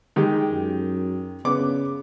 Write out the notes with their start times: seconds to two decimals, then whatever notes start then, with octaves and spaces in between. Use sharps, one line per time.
0.16 D#3 G#3 G4
0.51 F#2
1.45 C#3 B3 D6